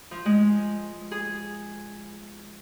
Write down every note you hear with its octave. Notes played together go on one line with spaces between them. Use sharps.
F3
G#3
G#4